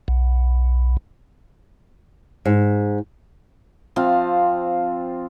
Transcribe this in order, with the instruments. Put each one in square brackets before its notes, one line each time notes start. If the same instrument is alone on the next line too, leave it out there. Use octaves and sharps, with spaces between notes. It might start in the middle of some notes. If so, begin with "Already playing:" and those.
[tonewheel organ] B1
[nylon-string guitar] G#2
[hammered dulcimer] F3 C4 F5